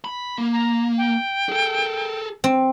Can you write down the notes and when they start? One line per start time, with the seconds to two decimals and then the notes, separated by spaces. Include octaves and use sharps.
0.05 B5
0.38 A#3
0.53 A#5
0.98 G5
1.49 G#4 A4
2.44 C4